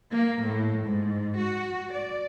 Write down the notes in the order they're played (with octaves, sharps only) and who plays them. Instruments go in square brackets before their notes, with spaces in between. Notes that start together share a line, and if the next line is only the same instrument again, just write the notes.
[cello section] A#3
A2
G#2
F#4
D5